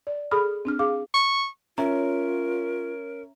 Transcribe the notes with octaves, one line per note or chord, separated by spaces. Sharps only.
D5
G#4 A4 B5 D#6 F6
C4 D4 F6
G#4 F5 D6
C#6
C#4 F4 A#4 C#5 E5 A#5